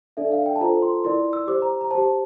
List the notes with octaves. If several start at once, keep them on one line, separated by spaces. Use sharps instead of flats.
D4 A4 D5 E5
F5
G5
A5
F4 A4 C5 A#5
C6
E4 A#4 D5 C6
E6
G4 C5 D6
A#5
A#5
G4 C5 A5